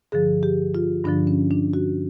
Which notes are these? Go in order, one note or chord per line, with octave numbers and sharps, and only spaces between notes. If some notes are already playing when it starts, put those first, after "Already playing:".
G2 D3 F3 G#4
G4
F4
G2 D3 F3 D4
C#4
D4
F#4